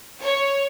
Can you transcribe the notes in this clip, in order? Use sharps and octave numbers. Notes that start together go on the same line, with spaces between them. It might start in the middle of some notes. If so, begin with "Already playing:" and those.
C#5